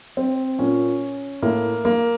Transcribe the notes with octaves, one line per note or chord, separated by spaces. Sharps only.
C4
A#2 C#4
A2 A#3
A#3